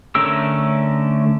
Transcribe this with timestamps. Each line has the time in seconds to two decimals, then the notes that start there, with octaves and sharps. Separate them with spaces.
0.15 D3 A3 C#4 A#4 E6